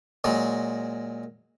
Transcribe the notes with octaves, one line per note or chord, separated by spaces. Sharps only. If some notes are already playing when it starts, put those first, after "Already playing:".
A#2 F#3 G#3